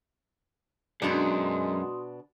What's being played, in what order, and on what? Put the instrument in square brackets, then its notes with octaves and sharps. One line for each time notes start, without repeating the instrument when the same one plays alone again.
[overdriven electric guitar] F#2 [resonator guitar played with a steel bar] B2 D4 [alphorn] G#3 [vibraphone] F#4 C6 D#6